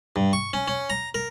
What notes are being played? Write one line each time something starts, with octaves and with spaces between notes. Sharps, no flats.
G2
C#6
C#4
C#4
A#5
A#4